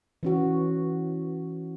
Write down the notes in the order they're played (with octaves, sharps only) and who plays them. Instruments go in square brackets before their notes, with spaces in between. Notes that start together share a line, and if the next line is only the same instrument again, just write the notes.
[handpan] E3 C#4 F#4